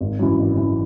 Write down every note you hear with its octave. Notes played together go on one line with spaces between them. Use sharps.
G#1
F#2 E3
G#1
F#2 E3